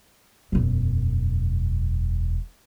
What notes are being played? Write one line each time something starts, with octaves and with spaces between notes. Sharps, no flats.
E1 F#2